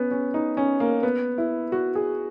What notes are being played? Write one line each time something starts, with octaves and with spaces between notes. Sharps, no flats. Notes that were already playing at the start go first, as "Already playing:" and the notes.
Already playing: B3 C#4
C#4
D#4
C#4
A#3
B3
E4
F#4
G#4